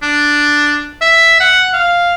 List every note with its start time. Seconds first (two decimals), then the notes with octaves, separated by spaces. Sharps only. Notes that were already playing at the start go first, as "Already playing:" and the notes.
0.02 D4
1.01 E5
1.40 F#5
1.73 F5